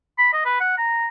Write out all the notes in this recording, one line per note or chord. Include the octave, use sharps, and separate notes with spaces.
B5
D#5
B4
F#5
A#5